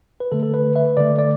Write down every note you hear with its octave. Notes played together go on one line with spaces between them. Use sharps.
B4
D3 A3 A4
A4
B4
B4 E5
D3 A3 A4 D5
D5